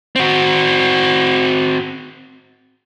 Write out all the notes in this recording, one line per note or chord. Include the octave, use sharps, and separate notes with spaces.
C4 F#4